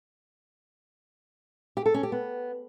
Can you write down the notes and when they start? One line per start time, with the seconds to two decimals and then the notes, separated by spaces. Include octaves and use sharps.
1.77 G4
1.86 A4
1.94 C#4
2.03 G4
2.12 B3